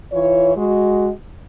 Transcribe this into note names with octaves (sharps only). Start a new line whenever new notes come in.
E3 F4 C#5
G#3 F#4